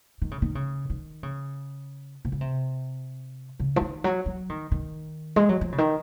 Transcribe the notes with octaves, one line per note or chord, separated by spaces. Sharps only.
D#3
C#3
D#3
C#3
D#3
C#3
C3
C#3
C3
C#3
F3
D#3
F#3
F#3
D#3
D#3
G#3
F#3
F3
C#3
D#3